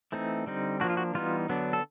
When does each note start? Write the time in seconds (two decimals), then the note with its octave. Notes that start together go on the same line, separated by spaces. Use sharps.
0.12 E3 A3 C4 D#4
0.46 D3 G3 C4 D#4
0.80 F3 A#3 D4 F#4
0.90 F4
0.97 F#4
1.14 E3 G3 B3 D#4 F4
1.49 D3 F#3 B3 D4
1.73 A4